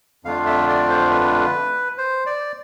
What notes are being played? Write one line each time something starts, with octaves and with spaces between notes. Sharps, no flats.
F2 D3 A3 D4 F4 F5
E5
D5
C5
B4
C5
D5